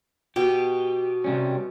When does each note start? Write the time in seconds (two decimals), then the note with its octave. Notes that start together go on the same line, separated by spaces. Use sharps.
0.36 B2 G4
1.24 C3 G3 C#4